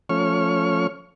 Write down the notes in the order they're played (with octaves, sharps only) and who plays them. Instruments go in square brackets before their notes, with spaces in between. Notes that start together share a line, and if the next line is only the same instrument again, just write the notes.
[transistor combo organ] F3 A3 C#4 C#5 C#6 F6